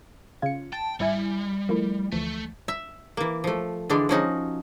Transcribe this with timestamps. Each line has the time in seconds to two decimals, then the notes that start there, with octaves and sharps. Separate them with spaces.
0.42 C#3 F4 G#6 C#7
0.73 G5 A5
1.00 G#1 G3 E4 G#5
1.69 F3 A3 A#3 E4
2.12 D2 E3 F3 A3
2.68 E5
3.17 E3 A#3
3.44 F3 A3
3.89 D3 E3 G#3 D4
4.09 F3 C#4 D#4 F#4